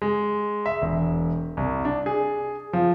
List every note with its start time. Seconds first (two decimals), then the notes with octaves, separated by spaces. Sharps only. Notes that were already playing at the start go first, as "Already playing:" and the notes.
0.02 G#3
0.66 E5
0.82 E1
1.57 C2
1.85 D4
2.06 G#4
2.73 F3